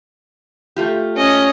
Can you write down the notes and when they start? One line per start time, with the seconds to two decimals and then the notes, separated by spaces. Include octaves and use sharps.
0.76 A3 F4 G4
1.16 C#4 D#5